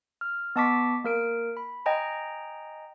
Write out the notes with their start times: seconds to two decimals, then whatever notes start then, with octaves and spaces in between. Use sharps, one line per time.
0.21 F6
0.56 B3 D#5 A5 C#6 D6 B6
1.04 A#3 A#4 D7
1.57 B5
1.86 D#5 G5 G#5 A#5